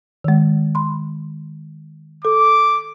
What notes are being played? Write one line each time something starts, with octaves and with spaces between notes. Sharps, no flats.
D#3 G#3
B5 C6
A4 D6